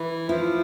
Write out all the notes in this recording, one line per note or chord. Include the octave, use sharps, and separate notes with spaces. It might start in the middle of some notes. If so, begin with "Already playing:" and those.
Already playing: E3
F3 E4